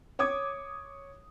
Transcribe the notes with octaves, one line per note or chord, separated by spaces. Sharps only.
C#5 D6 D#6 G#6